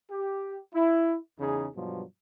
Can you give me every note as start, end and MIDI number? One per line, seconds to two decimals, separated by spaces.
0.10 0.59 67
0.75 1.18 64
1.40 1.68 40
1.40 1.68 49
1.40 1.68 63
1.40 1.68 68
1.76 2.03 43
1.76 2.03 47
1.76 2.03 53
1.76 2.03 54